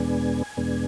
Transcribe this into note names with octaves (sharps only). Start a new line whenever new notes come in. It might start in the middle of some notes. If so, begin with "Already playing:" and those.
Already playing: E2 B2 G#3 B3 D4 G#5
E2 B2 G#3 B3 D4